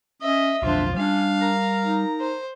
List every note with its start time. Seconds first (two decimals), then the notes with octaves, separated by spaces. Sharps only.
0.22 C#4 D#5 E5
0.63 B1 F2 D4 F4 C5
0.96 G3 C#4 D4 F5
1.41 A#4 A#5
1.81 D#4
2.20 C5